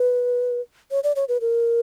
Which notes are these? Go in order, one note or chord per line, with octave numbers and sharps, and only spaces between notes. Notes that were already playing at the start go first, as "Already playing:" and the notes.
Already playing: B4
C#5
D5
C#5
B4
A#4